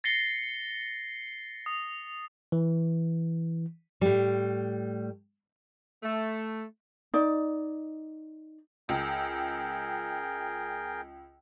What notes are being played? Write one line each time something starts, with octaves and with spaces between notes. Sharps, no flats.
A6 A#6 C7 C#7 G7
D#6
E3
A2 G3
A3
D#4 D5
C#2 G#4 A#4 G5